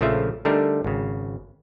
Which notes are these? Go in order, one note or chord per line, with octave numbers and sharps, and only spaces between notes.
A#1 C#3 F3 A3 F4 E5
D3 G3 A3 D4 D#4 A#4
G#1 C#3